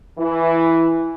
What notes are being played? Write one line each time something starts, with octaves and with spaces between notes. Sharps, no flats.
E3